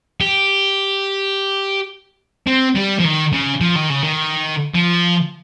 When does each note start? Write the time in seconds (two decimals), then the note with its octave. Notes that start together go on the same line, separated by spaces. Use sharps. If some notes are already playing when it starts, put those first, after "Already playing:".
0.21 G4
2.47 C4
2.76 G3
3.00 F3
3.05 D#3
3.33 C#3
3.61 F3
3.76 D#3
3.90 C#3
4.03 D#3
4.75 F3